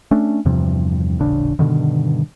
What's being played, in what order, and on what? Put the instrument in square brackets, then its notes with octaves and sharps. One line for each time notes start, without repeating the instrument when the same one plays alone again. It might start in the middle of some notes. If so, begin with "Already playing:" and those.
[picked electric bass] A3 C#4 D4
E2 G2 C3 F3
D#1 A1 C#3 D4
G2 B2 D3 D#3